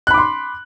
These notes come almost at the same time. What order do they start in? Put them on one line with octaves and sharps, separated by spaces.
F#6 B5 D6 C6